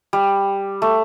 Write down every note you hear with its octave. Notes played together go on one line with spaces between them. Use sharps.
G3
A3